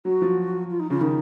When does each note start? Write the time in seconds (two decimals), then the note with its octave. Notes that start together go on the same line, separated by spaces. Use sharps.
0.05 F#3 F#4
0.22 F3
0.70 F4
0.80 D#4
0.90 C#3 F4
1.01 D#3 D#4